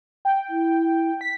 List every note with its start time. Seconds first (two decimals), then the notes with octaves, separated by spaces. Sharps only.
0.25 G5
0.50 E4
1.21 B6